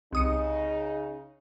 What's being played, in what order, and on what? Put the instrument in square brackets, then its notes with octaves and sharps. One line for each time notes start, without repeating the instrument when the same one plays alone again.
[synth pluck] C2 D#6 C#7 [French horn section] C#3 D#4